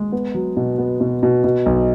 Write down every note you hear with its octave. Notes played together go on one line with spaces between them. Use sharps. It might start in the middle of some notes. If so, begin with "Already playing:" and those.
Already playing: G#3
B3
F#3
B2
B3
B2
B2
B2
B1